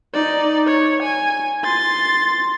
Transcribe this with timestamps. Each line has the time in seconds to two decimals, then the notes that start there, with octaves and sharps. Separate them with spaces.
0.14 D#4 D5
0.66 C#5
1.02 G#5
1.64 C6 A6